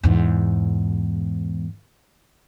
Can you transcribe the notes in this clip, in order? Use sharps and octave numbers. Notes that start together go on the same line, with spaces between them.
E2 G#2